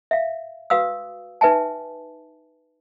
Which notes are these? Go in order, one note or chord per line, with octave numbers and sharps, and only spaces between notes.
E5 F5
F#4 B4 F5 D#6 E6
D#4 B4 E5 G#5 A5